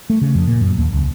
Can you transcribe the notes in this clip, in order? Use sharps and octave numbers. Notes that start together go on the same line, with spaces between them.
A3
C#3
F2
A#2
F#2
D#2
C#2